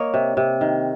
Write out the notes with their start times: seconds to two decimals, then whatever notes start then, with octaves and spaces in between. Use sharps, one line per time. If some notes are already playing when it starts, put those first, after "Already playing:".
Already playing: A#3 C#5 D#5
0.14 C3
0.37 C3
0.61 D#3